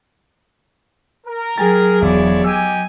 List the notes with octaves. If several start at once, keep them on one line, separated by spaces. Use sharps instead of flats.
A#4
F#3 G#4 G5 G#5 A6
E1 E4 C#5 D5
D#4 G4 G#5 D6 E6